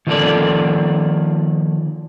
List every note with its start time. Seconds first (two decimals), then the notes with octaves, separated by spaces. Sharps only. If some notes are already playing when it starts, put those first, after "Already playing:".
0.07 D#3 F3 A#3 A4 D5